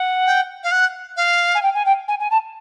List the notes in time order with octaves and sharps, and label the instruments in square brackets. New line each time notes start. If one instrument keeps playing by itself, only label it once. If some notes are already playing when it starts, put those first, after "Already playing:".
Already playing: [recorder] F#5
[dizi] G5
F5
F#5
F5
[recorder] G#5
G5
G#5
G5
G#5
G#5
A5